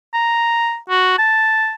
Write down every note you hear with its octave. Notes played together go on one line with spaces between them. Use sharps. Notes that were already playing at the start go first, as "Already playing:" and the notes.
A#5
F#4
A5